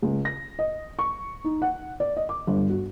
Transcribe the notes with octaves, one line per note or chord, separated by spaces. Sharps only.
C#2
A#6
D#5
C#6
D#4
F#5
D5
D#5
D6
G1
F#4